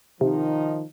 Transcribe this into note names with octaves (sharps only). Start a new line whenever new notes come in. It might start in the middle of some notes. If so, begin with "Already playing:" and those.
C3 D#3 F3 D#4